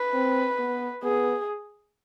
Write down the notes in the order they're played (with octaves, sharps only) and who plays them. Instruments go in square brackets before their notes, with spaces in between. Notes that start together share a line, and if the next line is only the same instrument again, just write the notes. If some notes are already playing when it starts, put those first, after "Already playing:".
Already playing: [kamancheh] B4
[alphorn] C4
B3
[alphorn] B3 [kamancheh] G#4